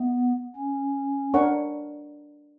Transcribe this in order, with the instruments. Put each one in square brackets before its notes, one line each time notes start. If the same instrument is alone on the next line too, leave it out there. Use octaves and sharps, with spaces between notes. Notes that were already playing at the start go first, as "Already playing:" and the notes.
Already playing: [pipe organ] B3 [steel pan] E5
[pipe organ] C#4
[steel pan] D4 A#4 C#5 F#5 C#6